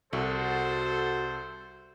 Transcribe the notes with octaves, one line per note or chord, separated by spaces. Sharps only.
C2 F#4 A4 C5